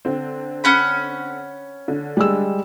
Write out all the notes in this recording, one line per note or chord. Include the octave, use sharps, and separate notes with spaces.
D3 C4
C#4 F#5 B5
D3
G3 G#3 E6